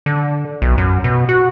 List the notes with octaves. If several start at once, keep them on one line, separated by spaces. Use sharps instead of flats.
D3
B1
F#2
B2
F#4